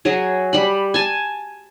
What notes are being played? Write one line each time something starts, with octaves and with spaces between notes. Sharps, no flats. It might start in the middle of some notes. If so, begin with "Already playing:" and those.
F#3 G#4
G3 B5
G#5 A5